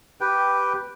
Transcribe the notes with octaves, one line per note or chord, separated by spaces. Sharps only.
G4 B4 G5